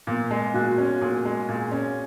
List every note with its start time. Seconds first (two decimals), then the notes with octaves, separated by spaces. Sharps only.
0.07 A#2 B3
0.31 G#3
0.54 A#2 F#4
0.78 C#4
1.01 A#2 G#4
1.25 G#3
1.48 A#2
1.72 C#4